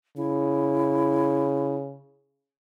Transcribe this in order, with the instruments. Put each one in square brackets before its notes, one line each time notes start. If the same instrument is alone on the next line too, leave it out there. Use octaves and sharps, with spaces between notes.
[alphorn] C#3 [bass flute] E4